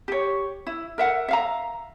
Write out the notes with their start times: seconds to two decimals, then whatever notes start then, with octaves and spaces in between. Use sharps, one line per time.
0.08 G4 C#5
0.67 E4
0.98 A#4 E5 F#5
1.29 E5 F5 A#5